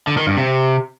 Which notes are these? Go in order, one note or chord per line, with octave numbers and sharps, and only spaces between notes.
D3
D#3
G2
C3